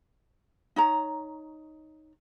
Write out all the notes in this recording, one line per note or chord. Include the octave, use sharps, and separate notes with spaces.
D#4 C#5 A#5